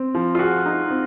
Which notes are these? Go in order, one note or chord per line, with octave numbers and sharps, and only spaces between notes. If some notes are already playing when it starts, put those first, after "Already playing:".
Already playing: C4
F3
F4
F#4 G#4
D#4
C4